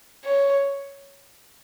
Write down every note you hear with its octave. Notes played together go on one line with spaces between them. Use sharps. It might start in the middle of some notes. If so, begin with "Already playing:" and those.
C#5